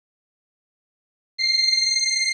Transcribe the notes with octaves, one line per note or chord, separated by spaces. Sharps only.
C7